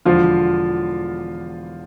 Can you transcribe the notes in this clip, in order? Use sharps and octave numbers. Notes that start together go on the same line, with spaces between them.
E1 E2 D3 F3 F4